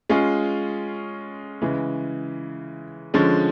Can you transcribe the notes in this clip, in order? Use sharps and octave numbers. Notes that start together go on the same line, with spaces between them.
G#3 C#4 F4 G#4
C#3 E3 G#3
D3 F3 G#3 C#4